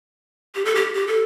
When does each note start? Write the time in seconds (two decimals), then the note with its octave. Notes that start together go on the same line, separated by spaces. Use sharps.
0.55 G4
0.65 A4
0.75 G4
0.95 G4
1.07 A4